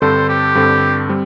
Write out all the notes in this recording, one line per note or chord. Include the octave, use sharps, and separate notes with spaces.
G2 D3 C4 A4 C5
G4
G2 D3 C4 A4
G3 C4